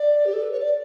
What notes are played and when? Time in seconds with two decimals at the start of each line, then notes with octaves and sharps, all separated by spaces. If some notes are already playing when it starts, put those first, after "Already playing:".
Already playing: D5
0.25 G4
0.34 A4
0.42 B4
0.51 C#5
0.60 D5